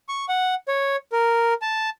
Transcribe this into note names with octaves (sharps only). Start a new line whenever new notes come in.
C#6
F#5
C#5
A#4
A5